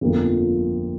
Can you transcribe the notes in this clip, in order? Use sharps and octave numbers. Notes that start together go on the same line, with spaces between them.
G1 F2 F3 A#3